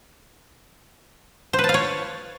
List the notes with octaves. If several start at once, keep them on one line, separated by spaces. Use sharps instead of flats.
C5
B4
A5
F5
C#5